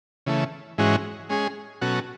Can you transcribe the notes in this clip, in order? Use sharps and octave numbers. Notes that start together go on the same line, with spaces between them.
C#3 E3 A3
G#2 E3 G#3 C#4 F#4
G#3 C#4 G#4
B2 F#3 C#4 F#4 A4